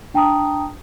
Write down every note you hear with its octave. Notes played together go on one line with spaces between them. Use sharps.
D4 G5 A5 A#5 D#6